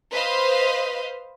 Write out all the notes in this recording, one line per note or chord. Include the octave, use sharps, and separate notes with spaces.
B4 C5 D#5 F5